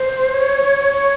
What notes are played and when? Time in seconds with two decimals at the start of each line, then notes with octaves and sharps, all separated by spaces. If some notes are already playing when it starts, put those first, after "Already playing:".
Already playing: C5
0.34 C#5
0.93 C#5